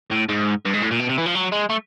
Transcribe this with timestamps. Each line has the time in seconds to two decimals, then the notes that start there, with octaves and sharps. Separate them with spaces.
0.11 A2
0.29 G#2
0.65 G2
0.73 G#2
0.82 A2
0.91 A#2
0.99 B2
1.09 C3
1.18 E3
1.26 F3
1.35 F#3
1.52 G#3
1.70 A3